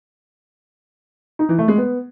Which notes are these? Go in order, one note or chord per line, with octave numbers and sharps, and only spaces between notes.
D#4
E3
A3
G#3
B3